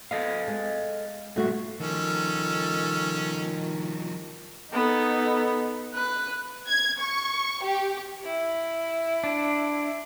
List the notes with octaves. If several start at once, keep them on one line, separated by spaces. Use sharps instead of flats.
B3 A4 D#5 F5
G#3
G2 A#2 A3 F#4
D#3 F3 G3 C#4 A4
B3 D#4 A4
B4 F#6
G#6
C#6
G4
E4
D4